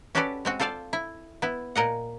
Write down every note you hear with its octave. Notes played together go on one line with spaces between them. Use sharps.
C#4 F#4 G4 A4 B4 D5
G#3 C4 F#4
F4 A4 C5 D5 F5
E4
B3 E4
A#2 A#4 D#5 F#5